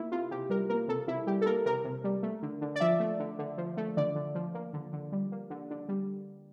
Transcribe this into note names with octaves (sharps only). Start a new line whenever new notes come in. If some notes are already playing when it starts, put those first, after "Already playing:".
Already playing: A#3 E4
C3 F4
C3 G4
G3 A#4
A#3 A#4
C3 A4
C3 E4
G3 G4
A4
A#3 A#4
C3 A#4
C3
G3
A3
D3
D3
D5
F3 E5
A3
D3
D3
F3
A3
D3 D5
D3
F3
A#3
D3
D3
G3
A#3
D3
D3
G3